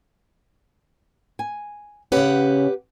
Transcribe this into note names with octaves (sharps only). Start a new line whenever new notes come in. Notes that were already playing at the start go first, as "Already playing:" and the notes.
G#5
C#3 C#4 G4 B4 F#5